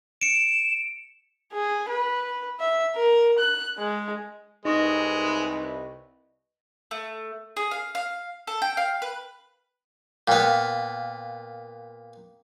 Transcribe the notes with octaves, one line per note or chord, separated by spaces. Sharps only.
C#7 D7 E7
G#4
B4
E5
A#4
F#6
G#3
C2 G#3 D#4 B4 D#5 C#6 A#6
A3
G#4
F5
F5
A4
G5
F5
B4
A#2 B3 F5 G5